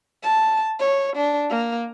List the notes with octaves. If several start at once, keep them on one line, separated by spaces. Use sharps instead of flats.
A5
C#5
D4
A#3